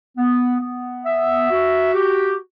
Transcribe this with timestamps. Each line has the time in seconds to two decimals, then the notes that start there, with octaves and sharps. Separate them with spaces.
0.17 B3
0.61 B3
1.06 E5
1.50 F#4
1.94 G4